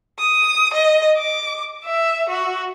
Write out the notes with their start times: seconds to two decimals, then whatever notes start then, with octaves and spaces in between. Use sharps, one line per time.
0.19 D#6
0.74 D#5
1.17 D6
1.85 E5
2.29 F#4